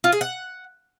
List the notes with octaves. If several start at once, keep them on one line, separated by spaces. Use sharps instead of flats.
F4
G#4
F#5